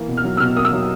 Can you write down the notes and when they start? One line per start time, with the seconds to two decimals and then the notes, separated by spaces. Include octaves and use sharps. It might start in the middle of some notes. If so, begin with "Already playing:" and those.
Already playing: E3 A#3
0.08 B2
0.17 F6
0.24 F#3
0.37 E6
0.40 B2 F6
0.56 A#3 D#6
0.65 E6
0.73 F#3